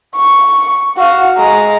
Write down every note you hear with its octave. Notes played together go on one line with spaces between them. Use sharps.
C#6
F#4 F5
G#3 A#5